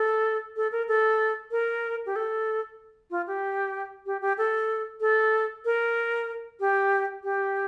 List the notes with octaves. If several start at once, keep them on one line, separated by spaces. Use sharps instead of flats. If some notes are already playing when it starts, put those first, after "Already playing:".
Already playing: A4
A4
A#4
A4
A#4
G4
A4
F4
G4
G4
G4
A4
A4
A#4
G4
G4